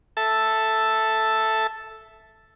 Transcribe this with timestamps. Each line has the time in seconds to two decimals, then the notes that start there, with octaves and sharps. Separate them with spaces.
0.17 A4 E5 A5